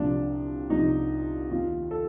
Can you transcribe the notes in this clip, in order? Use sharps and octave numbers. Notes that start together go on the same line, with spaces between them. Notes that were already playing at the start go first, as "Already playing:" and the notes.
Already playing: C2 A#2 F3 D4
C2 A#2 F3 D#4
D#2 D#3 F4
A4